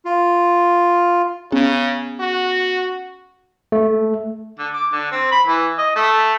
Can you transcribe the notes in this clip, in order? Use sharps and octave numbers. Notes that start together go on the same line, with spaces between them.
F4
C#3 B3 C#4 G#4
F#4
A3
D3
D6
D3
C4
B5
E3
D#5
A3